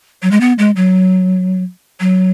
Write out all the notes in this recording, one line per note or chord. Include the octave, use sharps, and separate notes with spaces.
F#3
G#3
B3
G#3
F#3
F#3